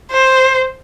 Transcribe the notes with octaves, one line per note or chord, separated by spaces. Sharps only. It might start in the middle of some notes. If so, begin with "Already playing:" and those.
C5